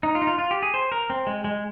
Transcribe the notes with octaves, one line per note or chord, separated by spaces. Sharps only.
D#4
F4
D#4
F4
F4
G4
G#4
C5
A#4
C4
G#3
G#3